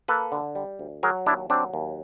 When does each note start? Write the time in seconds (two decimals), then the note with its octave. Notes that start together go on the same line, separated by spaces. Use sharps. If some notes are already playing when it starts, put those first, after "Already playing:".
0.08 A#3 A4 B4
0.32 D3
0.55 G3
0.79 D2
1.03 F#3 G#4 A#4
1.26 D#2 D4 E4
1.50 F#3 C4 D4
1.74 D#2